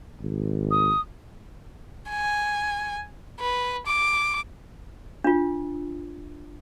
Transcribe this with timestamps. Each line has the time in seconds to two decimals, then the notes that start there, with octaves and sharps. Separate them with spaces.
0.20 G#1
0.71 D#6
2.10 G#5
3.40 B4
3.87 D6
5.24 D4 F4